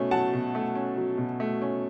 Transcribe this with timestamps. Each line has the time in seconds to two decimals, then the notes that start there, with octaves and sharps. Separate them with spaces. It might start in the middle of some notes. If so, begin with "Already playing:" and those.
Already playing: B2 A3 C#4
0.11 F#3 F#5 A5
0.34 B2
0.55 A3
0.75 C#4
0.97 F#3
1.18 B2
1.40 A3
1.62 C#4